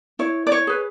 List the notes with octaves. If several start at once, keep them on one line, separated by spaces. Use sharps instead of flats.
E4 C#5
D5
C#5
G#4 B4